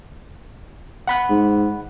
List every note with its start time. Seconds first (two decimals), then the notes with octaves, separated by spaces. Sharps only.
1.07 F#5 B5 F#6
1.30 G#2